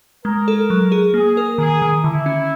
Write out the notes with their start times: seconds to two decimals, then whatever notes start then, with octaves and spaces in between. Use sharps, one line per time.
0.25 G#3 A#4
0.48 A4
0.70 F#3
0.92 G#4
1.14 A#3 G#4
1.37 A#4
1.58 D#3 G#4
1.82 D#3
2.03 D3 E4
2.26 C#4